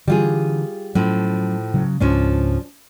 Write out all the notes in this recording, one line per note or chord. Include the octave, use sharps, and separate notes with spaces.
D3 E3 G3 F4 G#4
A2 F3 F#3 C#4
C#3 F#3
C#2 G#2 F3 G#3 C#4 D4